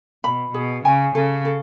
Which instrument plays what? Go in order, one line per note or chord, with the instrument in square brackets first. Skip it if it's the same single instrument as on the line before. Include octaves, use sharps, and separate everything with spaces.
[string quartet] B2 [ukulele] B5
[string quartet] B2 [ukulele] G#4
[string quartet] C#3 [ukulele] G#5
[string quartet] C#3 [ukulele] A4
[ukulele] A4